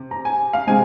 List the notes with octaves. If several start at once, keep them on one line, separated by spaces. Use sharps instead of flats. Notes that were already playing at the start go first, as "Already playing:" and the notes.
Already playing: C3
A#5
G#5
F5
C3 G#3 C4 G#5